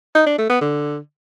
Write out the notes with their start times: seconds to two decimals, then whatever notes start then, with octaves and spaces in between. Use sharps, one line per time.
0.15 D#4
0.26 D4
0.38 A3
0.50 B3
0.61 D3